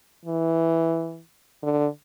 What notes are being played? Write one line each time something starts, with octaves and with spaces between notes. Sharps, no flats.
E3
D3